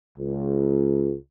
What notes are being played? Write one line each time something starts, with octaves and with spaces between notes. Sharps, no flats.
C#2